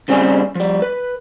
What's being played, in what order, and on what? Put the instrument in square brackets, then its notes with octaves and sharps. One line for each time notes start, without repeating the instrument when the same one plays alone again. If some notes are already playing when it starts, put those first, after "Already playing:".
[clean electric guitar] D#2 C#3 G3 C4 D4 G#5
F3 G3
B4